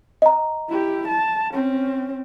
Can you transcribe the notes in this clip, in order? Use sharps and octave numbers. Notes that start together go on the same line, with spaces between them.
D#5 A#5
E4 G4
A5
C4 C#4